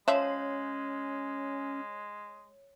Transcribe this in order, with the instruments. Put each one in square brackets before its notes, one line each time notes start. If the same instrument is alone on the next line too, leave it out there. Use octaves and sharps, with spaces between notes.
[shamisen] F3 E5 [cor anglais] G#3 [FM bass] C#4 [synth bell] C#5